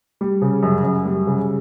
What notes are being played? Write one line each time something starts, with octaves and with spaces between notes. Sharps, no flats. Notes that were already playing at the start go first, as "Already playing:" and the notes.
G3
C#3
F#2
F#2
G3
C#3